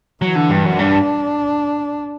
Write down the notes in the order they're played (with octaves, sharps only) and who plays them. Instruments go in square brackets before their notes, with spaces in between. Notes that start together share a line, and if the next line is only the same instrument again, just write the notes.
[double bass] E3 [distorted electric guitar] F#3
[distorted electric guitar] D3
G2
F#2
[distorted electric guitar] G2 [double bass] D4